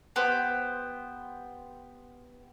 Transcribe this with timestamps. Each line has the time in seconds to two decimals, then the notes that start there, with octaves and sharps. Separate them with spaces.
0.16 B3 G4 C5